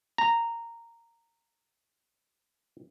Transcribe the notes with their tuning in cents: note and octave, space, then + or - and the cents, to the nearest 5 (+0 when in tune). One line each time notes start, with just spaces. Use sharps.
A#5 -10